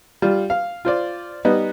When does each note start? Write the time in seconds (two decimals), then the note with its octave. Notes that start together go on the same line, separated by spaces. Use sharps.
0.22 G3 F4
0.50 F5
0.85 F4 C5 D5
1.45 G3 B3 D#4